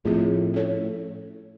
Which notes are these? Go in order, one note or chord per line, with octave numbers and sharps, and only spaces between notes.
A2 F3 A3 C4 F4 G#4
C#4 E4 A4 C#5